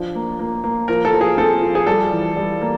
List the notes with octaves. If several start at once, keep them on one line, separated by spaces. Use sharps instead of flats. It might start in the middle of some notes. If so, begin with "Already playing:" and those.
Already playing: F3 D4
A#3
A#3
A#3
F3 A#4
A4
F3
G#4
C4 A4
F3
G#4
G3 A4
E3
G3
A#3